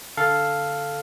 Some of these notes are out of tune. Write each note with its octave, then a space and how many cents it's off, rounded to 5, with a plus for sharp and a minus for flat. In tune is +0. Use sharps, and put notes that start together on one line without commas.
D3 +0 A4 +0 F5 +0